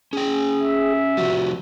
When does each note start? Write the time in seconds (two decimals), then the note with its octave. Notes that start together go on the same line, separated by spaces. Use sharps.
0.13 C#4 G#4 G5
0.63 E5
1.17 C3 F3 G3 F#4